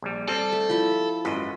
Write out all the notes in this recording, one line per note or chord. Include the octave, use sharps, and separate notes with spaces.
A#1 G3
G3 C4 A4
A3
F3 E4
G#1 F#2 B4 D#5